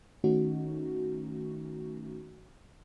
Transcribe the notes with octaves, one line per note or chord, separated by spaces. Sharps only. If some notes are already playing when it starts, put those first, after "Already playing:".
D#3 A3 C#4 D#4 F#4